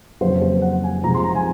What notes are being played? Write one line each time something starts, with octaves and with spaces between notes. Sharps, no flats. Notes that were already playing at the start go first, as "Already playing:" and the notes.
F2 C#3 F#3 A#3 C5
C5
F#5
G#5
C3 F3 G#3 A#5
C6
A#5
G#5